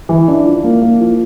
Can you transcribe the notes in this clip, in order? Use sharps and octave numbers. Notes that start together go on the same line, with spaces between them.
E3
D4
F3
A#3
A#3
F3